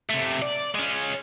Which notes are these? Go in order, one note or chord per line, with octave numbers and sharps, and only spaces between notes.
C3 A3
D5
G#3 C#4